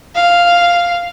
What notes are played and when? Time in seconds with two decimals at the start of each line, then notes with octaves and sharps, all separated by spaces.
0.15 F5